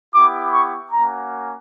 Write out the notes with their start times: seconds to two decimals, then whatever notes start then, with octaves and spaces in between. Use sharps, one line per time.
0.14 B3 E4 G4 D6
0.53 C#6
0.92 A#3 C#4 F#4 A#5